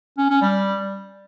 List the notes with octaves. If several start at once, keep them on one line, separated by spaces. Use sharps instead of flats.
C#4
C#4
G3